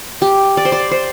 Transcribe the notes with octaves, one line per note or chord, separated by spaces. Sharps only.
G4
D5
C5
D5
C5